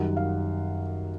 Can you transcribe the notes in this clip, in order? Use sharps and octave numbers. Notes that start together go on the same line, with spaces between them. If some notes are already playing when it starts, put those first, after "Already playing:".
Already playing: F#2 D#3 G3 F#5
F5